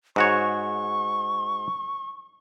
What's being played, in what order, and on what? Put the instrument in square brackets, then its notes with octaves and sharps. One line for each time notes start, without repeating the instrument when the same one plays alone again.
[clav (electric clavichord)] G#2 F#4 C#5 [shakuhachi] C#6